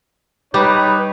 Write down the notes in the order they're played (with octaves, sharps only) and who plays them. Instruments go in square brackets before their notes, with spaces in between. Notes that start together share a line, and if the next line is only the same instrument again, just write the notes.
[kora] G3 G4 [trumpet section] D#4 B4 C#5